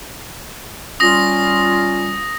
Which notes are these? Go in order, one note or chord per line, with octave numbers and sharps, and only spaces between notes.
G3 C#4 F4 D#6 A#6